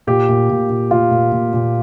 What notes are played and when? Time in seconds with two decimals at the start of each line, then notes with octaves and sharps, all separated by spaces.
0.07 A#2 G4
0.29 A#2
0.50 A#2
0.69 A#2
0.91 A#2 F4
1.11 A#2
1.32 A#2
1.53 A#2